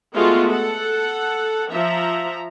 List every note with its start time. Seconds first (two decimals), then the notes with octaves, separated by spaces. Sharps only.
0.15 G#3 A3 B3 F4 F#4
0.51 A4 F#5
1.71 F3 E5 A#5